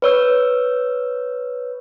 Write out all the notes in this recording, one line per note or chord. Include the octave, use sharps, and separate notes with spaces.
B4 C#5 E6